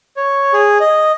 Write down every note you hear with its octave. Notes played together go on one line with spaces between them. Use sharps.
C#5
G#4
D#5